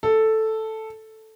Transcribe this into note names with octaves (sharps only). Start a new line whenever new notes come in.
A4